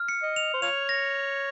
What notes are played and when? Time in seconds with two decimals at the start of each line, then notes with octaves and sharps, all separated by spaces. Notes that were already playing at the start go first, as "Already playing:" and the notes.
Already playing: F6
0.09 C#7
0.23 D#5
0.36 F7
0.54 C5
0.62 F4 C#5 F7
0.89 A#6